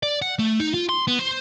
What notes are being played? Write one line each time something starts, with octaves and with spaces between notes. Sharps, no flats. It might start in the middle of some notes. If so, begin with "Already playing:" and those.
D5
F#5
A3
D#4
F4
C6
B3
C5